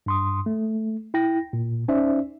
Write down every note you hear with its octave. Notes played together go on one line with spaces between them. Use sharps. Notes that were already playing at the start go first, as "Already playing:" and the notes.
G2 C6 D#6
A3
E4 G5 A#6
A#2
C#4 D#4 C5 D5 E5